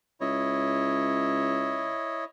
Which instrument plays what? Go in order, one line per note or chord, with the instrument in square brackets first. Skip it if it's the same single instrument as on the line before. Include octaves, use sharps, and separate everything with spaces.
[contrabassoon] C#2 [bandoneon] E4 C#5 D#5